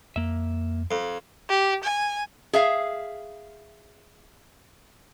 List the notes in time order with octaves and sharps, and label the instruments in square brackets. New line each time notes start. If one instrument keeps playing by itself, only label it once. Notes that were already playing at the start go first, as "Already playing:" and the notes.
[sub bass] F2 [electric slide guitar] A#3 E5
[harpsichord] F2
[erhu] G4
G#5
[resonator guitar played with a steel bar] G#4 E5 F5